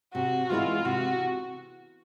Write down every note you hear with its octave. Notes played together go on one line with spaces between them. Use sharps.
C3 F#4
E3 G#3 B3 E4 F4
C3 F#4